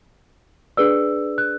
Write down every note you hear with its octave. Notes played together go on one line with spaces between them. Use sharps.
D4 G#4 B4 D5 E6
F#6